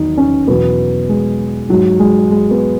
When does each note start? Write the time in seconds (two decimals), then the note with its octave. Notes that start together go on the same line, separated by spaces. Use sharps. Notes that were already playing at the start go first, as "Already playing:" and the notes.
Already playing: E2 D#3 F#3 D#4
0.17 C#4
0.48 E2 B2 F#3 B3
1.09 G#3
1.69 G#2 F#3
1.99 G#3
2.31 G#3
2.51 B3